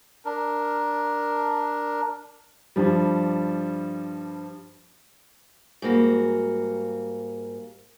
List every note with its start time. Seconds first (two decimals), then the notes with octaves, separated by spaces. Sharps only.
0.25 D4 A#4
2.76 G2 F3 G3
5.82 G#2 G3 A#3 F#4